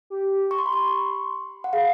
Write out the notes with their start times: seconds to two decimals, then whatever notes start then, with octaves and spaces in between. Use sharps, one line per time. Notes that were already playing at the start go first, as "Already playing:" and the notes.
0.10 G4
0.51 C#6
0.58 C6
0.66 B5
0.73 C6
1.64 F#5
1.72 G#4 F5